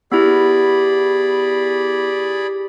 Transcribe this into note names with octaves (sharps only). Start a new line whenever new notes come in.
B3 E4 G4 G#4 D5 B5